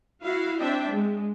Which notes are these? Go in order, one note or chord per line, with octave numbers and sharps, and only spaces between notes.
E4 F#4 F5
C4 D4 E5 G5
G#3